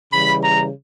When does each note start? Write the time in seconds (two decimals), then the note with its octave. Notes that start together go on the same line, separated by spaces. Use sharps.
0.13 C#3 E3 G3 B5
0.42 A#5